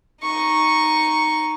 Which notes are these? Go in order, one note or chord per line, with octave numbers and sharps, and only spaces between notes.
D#4 C#6